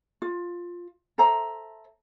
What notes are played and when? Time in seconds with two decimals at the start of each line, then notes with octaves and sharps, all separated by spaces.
0.22 F4
1.18 A4 C5 E5 A#5